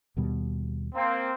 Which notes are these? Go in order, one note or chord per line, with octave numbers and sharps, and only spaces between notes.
D#2 B2 G3
A#3 C4